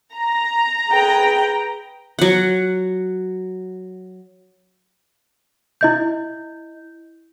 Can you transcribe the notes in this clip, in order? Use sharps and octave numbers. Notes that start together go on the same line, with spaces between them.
A#5
G#4 B4 G5
F#3 F#5
E4 D#5 G6